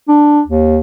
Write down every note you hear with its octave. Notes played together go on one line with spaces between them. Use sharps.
D4
D#2